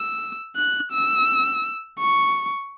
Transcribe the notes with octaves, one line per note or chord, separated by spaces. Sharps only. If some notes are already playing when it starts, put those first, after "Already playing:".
Already playing: E6
F#6
E6
C#6